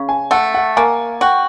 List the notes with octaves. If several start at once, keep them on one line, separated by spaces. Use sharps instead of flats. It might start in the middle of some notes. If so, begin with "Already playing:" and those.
Already playing: C#3
G#5
A3 F#5
F#5
A#3 G#5
F#4 G5